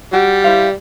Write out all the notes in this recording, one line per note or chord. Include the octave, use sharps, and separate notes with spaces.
G3 F#4 G5
E4 C5 F5